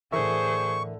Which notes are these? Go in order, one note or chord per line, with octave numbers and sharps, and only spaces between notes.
A2 D3 E3 G#4 A#4 C5 E5 C#6